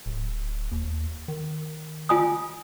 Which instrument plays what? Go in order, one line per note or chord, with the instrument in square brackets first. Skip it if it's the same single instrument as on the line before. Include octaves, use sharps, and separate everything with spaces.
[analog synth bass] D1
D#2
D#3
[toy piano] F4 G#5 D#6